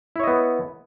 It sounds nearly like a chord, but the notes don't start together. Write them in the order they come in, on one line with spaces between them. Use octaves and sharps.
E4 C#5 D#5 B3